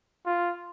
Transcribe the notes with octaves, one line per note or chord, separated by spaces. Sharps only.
F4